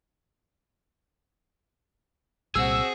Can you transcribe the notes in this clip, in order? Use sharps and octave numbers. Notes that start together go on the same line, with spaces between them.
C2 A#2 G3 C4 F#4 G#4 E6